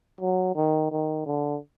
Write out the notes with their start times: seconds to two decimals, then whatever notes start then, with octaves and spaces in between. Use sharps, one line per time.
0.20 F#3
0.55 D#3
0.91 D#3
1.26 D3